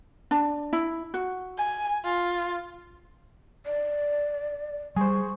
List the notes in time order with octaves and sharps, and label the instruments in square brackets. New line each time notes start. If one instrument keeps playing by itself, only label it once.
[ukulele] D4
E4
F#4
[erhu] G#5
F4
[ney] D5
[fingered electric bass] G3 [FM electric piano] G#4 C5 [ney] C#6